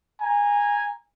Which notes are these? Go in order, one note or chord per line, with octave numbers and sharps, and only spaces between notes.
G#5 A#5